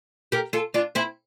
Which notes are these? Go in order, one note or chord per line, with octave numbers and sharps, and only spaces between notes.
G4 A#4
F4 A4
D4 F4
C4 E4